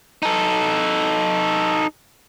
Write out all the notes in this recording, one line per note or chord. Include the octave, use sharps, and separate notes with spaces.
D#4 A4